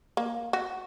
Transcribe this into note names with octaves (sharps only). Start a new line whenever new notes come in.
A#3
F#4